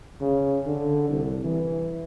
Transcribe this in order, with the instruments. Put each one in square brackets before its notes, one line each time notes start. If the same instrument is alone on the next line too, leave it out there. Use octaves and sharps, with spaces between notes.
[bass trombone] C#3
D3
C2
E3